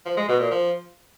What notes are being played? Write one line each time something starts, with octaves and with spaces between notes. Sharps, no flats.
F3
G#3
B2
A#2
F3